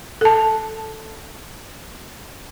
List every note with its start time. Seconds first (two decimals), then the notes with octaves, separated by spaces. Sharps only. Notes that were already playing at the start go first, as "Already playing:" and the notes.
0.21 A4 A5